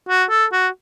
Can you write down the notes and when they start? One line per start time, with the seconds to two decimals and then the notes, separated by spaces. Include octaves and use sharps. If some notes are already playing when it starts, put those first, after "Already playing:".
0.09 F#4
0.30 A4
0.53 F#4